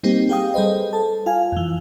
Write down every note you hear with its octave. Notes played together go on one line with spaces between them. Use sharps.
G3 A#3 C4 D#4 G4
G4 G#4 F5 G5 D#6
G3 G#4 A4 B4 C5 D#5
A4 A5
F4 F5 G#5
F2 E3